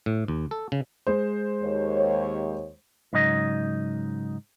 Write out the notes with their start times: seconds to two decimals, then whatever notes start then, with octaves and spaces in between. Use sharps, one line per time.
0.06 A2
0.28 D#2
0.51 A4
0.72 C#3
1.07 G#3 C5
1.63 D#2 C#5
3.13 G#2 C#3 F#3 D#4 D#5